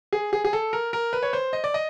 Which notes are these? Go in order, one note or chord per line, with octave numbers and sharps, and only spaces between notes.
G#4
G#4
G#4
A4
A#4
A#4
B4
C#5
C5
D#5
D5
D#5